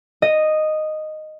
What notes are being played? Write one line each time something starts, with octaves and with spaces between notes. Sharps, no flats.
D#5